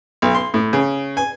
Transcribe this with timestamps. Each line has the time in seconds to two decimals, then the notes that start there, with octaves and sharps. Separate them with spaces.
0.22 B1
0.34 C6
0.54 A2
0.73 C#3
1.17 G#5